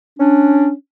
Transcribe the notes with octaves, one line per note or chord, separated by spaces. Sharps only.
C#4 D4